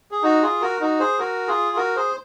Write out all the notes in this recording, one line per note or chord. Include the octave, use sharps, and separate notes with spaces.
G#4
D#4 F#4
F4 G#4
F#4 A#4
D#4 F#4
G#4 C5
F#4 A#4
F4 G#4
F#4 A#4
G#4 C5